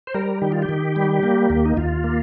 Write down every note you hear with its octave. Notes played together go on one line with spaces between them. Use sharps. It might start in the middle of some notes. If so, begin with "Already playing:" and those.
C5
G3 A#4
D#3 G4
F4
G4
D#3
G3
A#3
D#2
D#4
D#2 F4
A#3